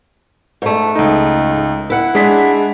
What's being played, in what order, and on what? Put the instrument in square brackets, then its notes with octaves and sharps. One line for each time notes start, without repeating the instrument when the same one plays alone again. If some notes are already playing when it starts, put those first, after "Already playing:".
[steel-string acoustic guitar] G#2 A3
[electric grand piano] C#2 D#4
[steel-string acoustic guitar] E4 F#5
[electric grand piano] G#3 D4 B6